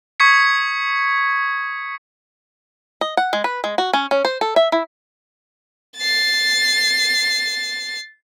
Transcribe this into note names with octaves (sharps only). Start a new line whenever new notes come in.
C#6 D#6 G#6 B6 C#7
D#5
F#5
G#3
B4
G#3
F#4
C#4
C#4
C5
A4
E5
E4
A6 C7